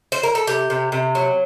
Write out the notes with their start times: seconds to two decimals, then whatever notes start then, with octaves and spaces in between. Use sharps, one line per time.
0.12 C5
0.23 A#4
0.35 A4
0.47 C3 G4
0.70 C3
0.92 C3
1.15 F#3